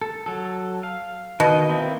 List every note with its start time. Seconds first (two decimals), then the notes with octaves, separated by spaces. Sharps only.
0.02 A4
0.26 F#3 A4
0.83 F5
1.40 B2 D#3 D#5
1.69 A#3 C4 E4